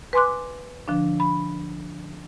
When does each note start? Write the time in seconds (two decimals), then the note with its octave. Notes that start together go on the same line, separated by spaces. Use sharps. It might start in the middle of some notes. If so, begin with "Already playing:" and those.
0.13 B4 G#5 C6 D6 F#6
0.88 D3 F3 D4
1.20 B5